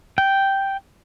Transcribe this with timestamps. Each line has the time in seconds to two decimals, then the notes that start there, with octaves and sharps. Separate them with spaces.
0.18 G5